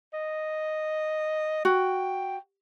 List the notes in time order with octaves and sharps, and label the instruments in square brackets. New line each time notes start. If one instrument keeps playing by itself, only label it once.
[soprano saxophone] D#5
[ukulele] F#4 [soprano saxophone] G5